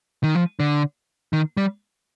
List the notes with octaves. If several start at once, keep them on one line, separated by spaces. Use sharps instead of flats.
D#3
F3
D3
D#3
G3